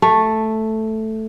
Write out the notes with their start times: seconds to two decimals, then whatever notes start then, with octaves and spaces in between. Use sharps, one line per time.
0.02 A3